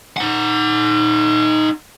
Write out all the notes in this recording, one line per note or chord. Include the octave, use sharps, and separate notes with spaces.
D#4 F#5